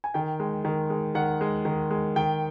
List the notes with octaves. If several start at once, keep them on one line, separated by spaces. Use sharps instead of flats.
G#5
D#3 G5
G#3
D#3
G#3
D#3 F#5
G#3
D#3
G#3
D#3 G5